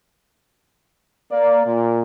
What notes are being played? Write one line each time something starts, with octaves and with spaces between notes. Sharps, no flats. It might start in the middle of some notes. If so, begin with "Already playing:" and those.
A#3 D5
A#2